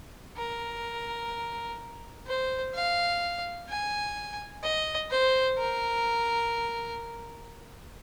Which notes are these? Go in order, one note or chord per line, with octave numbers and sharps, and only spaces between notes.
A#4
C5
F5
G#5
D#5
C5
A#4